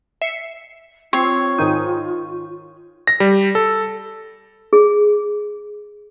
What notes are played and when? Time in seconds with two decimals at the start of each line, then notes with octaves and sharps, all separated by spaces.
0.22 E5 C7 C#7
1.13 C4 F4 C#5
1.58 G#2 D#3 D#4
3.07 A#6
3.20 G3
3.55 A4
4.73 G#4